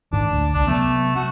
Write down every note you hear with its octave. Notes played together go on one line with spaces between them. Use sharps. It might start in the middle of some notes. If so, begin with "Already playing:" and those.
G#2 D#3 D4
D2
C2 D4
C3 F#3 A3 B3
C4 F#4